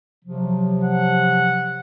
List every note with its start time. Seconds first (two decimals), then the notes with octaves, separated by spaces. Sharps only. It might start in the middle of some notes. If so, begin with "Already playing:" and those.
0.25 C3 F3 F#3
0.84 F#5